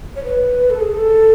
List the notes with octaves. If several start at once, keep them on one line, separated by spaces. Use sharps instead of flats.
C#5
B4
A4
G#4
A4